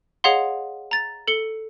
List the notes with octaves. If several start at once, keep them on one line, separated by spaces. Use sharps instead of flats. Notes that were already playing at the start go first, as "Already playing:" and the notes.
G#4 C#5 D#5 F5 F#5 C6
A#5 A6
A4 C#7 G7